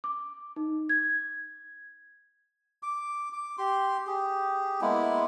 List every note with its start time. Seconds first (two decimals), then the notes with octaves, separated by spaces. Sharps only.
0.04 D6
0.56 D#4
0.89 G#6
2.83 D6
3.33 D6
3.58 G4 C6
4.07 G4 G#4
4.81 G#3 A#3 B3 E4